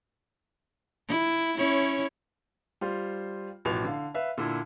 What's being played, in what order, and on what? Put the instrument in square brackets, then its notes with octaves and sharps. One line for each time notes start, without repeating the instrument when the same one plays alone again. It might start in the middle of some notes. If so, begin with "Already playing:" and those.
[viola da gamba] E4
C#4 E4 C#5
[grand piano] G3 F4 C5
A1 B2 F3 F7
D3 F5
B4 E5 F5
A#2 D3 E4